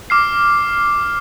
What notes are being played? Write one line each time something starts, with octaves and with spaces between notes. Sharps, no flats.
D6 F6 C7